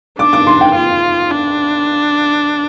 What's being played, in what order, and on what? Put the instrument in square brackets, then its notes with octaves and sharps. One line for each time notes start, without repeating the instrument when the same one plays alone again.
[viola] D4 [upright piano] D6
[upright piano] D6
C6
G5
[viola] F4
D4